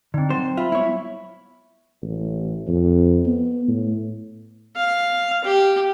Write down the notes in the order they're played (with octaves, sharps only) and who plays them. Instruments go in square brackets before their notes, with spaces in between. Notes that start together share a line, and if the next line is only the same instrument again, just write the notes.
[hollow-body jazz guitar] D3 [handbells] C4 D#4
[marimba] F#3 G3 [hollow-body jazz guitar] C5
[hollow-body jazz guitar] F4 [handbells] E5 B5
[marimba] G#3 B3 [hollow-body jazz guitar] E4 C#5
[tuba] A1
F2
B3
A2
[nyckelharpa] F5
G4